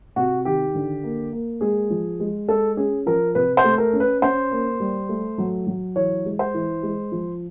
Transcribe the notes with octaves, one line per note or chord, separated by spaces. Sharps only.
C3 F#4
D#3 G4
D3
A#3
A#3
G#3 G#4
F3
G#3
G#3 A4
C#4 G#4
F3 A#4
C3 B4
C5
A3
A#4
C#4
B4
C#4 C5
A#3
G3
A3
F#3
F#3
E3 C#5
G#3
C5
E3
G#3
F3